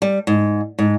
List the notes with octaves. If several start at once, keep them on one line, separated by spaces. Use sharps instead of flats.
G3
G#2
G#2